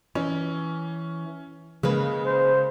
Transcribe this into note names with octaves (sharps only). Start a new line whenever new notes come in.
E3 C#4
C#3 G#3 A#3 B4
C5